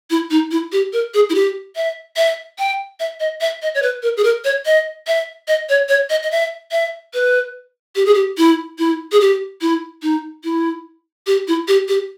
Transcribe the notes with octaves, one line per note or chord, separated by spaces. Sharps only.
E4
D#4
E4
G4
A#4
G#4
E4
G4
E5
E5
G5
E5
D#5
E5
D#5
C#5
B4
A#4
G#4
A#4
C#5
D#5
E5
D#5
C#5
C#5
D#5
D#5
E5
E5
B4
G4
G#4
G4
E4
E4
G#4
G4
E4
D#4
E4
G4
E4
G4
G4